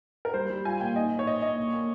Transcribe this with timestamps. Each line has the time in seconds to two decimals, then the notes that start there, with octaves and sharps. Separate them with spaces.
0.25 A#4
0.34 G3 C5
0.50 G3
0.65 F4 G#5
0.80 A#2 G5
0.95 D#4 D#5
1.11 D#4
1.19 C#5
1.26 A#2 D#5
1.42 A#2 D#5
1.57 A#2
1.73 A#3